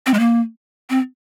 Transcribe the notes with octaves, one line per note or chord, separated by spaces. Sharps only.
C4
G#3
A#3
C4